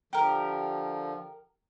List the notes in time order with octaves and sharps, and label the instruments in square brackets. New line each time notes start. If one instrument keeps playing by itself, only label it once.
[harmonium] D3 F3 [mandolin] G4 A#4